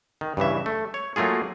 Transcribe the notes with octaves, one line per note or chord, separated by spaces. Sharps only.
D#3
G2 C#3 E3 E5
A3
C#5
F#3 A3 A#3 F4 G#4